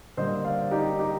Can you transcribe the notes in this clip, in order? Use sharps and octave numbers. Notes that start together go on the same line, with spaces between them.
D3 G3 A#3 C5 D#5
D5 F5
D#4 G4
D#4 G4